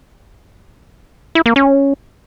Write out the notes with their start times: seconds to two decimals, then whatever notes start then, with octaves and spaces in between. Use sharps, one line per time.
1.35 E4
1.46 A#3
1.56 C#4